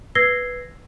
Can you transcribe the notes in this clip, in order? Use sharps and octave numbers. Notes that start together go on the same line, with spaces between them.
B4 E6 G#6 A#6 C7 G7